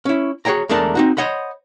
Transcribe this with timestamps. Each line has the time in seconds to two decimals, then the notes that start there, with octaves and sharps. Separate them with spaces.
0.05 C#4 E4
0.45 F#4 G#4 C#5 G5 A#5
0.69 E2 G#3 A3 D4 A#4 A5
0.95 C4 D#4 F#4
1.17 C5 C#5 D#5 F#5 B5